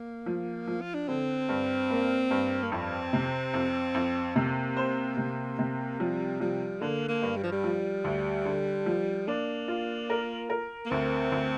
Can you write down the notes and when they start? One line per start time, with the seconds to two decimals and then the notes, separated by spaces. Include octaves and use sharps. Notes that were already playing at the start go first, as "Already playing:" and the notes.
Already playing: A#3
0.26 F3
0.67 F3
0.81 F4
0.94 D4
1.08 D3 C4
1.49 G2
1.90 A#3
2.31 G2
2.63 A#3
2.71 F2 C4
3.13 C3
3.54 F2
3.95 F2
4.36 C3 A#3
4.77 C5
5.17 C3
5.59 C3
6.00 F3 G3
6.40 F3 G3
6.81 D3 A#3
7.09 A#3
7.22 G2
7.37 G3
7.44 F3
7.52 G3
7.64 F3
8.04 D2
8.46 D3
8.86 F3
9.28 A#3 D4
9.68 F4
10.10 A#4
10.50 A#4
10.86 A#3
10.90 D2 C4
11.32 D2